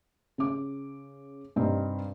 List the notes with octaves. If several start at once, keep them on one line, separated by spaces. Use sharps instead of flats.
C#3 D6
G2 C3 C4 D#4